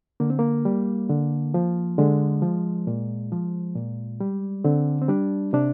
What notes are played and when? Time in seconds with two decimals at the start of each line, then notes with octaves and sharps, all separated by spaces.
0.20 D3 A#3
0.30 C4
0.39 A#3
0.65 G3
1.10 D3
1.54 F3
1.98 D3 G#3
2.42 F3
2.87 A#2
3.32 F3
3.75 A#2
4.20 G3
4.64 D3 C4
5.01 C4
5.09 G3 D4
5.53 C3 D4